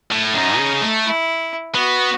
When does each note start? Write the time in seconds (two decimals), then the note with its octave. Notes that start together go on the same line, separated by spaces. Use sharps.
0.11 A2
0.34 F#2 D#4
0.58 C#3
0.82 A3
1.05 E4
1.75 B3 F#4